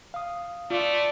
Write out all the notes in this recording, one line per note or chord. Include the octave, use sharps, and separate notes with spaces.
F5 D#6
A3 F4 D5